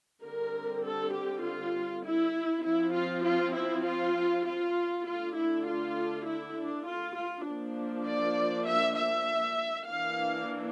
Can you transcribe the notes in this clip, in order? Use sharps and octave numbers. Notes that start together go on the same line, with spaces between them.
D3 G3 C4 A#4
A4
G4
F4
E4
F3 C4 E4
F4
F4
E4
F4
F4
D3 A3 D4 F4
E4
F4
E4
D4
F4
F4
F3 A#3 D4
D5
E5
E5
E3 A#3 D4 F5